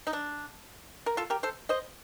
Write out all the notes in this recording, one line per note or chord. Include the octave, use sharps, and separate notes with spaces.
D#4
D4
A#4
F4 A4
G4 A#4
A4 C5
C5 D#5